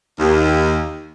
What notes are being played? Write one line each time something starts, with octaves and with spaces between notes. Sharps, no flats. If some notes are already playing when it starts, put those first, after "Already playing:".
D#2